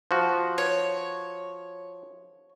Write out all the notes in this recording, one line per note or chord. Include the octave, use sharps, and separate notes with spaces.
F3 F#4
C#5